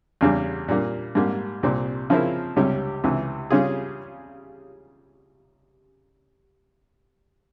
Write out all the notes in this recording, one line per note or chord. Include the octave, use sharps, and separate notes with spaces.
E2 C#3 G3
A#2 G3 A#3
G#2 G3 A#3
C2 A#2 G3 C4
C#3 F3 C4 E4 A#4
C#2 C3 G3 C#4 G4
C#2 C3 E3
C#3 G3 C#4 F4 G#4